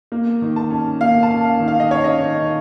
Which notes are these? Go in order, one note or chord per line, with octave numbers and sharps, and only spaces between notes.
A#3
D#3
A5
C#4
A#3 F5
A5
C#4
F5
D#3
F5
D#5
C#4 C#5
D#5
D#3